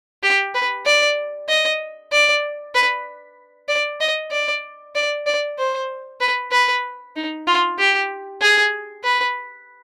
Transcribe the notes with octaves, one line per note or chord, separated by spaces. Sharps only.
G4
B4
D5
D#5
D5
B4
D5
D#5
D5
D5
D5
C5
B4
B4
D#4
F4
G4
G#4
B4